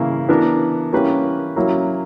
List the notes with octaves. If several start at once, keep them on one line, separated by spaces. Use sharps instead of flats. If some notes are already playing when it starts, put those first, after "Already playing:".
Already playing: C#3 E3 A#3 E4
E3 B3 D4 A#4
E3 A#3 C#4 G4 B4
F#3 A#3 C#4 E4